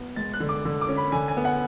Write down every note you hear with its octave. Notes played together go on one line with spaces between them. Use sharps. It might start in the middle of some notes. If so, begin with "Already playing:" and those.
Already playing: B3
G#3 A6
F#6
D3
D6
D3
D6
C#4
B5
D3 G#5
G#5
B3
F#5